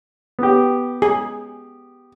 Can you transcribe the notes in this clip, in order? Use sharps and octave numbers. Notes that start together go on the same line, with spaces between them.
B3 G4
G#4